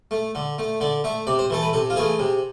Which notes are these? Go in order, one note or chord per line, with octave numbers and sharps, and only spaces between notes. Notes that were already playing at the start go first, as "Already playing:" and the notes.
A3
D3
A3
D3 D5
A3 E5
C3 D5
C5
E3 A3 A4
B4
C3 A4
F4
E3 A3 G#4
C3